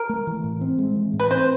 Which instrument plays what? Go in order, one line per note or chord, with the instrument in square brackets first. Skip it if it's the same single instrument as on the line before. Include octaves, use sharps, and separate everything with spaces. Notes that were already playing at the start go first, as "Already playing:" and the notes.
Already playing: [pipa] A#4
[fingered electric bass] A3
E3
A2
C4
G#3
E3
A2
[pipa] B4
[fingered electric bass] C4 [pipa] C5